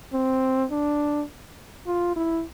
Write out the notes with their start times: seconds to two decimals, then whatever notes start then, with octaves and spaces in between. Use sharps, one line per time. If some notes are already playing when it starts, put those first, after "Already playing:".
0.13 C4
0.71 D4
1.87 F4
2.16 E4